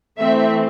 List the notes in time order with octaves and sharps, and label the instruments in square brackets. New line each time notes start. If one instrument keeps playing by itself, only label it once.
[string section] E3 A3 C4 E5